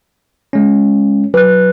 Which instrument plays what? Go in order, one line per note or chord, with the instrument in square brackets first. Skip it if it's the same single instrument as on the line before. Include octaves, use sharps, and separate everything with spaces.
[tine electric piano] G#3 C#4
[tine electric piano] F#3 [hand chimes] B4 F#6